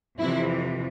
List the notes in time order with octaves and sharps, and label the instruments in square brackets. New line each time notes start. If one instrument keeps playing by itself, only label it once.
[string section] F2 C3 E3 E4